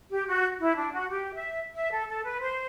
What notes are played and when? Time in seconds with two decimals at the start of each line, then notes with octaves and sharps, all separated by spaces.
0.11 G4
0.27 F#4
0.60 E4
0.77 D4
0.93 F#4
1.09 G4
1.34 E5
1.74 E5
1.91 A4
2.07 A4
2.24 B4
2.40 C5